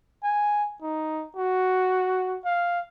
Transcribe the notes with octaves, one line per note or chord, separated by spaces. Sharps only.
G#5
D#4
F#4
F5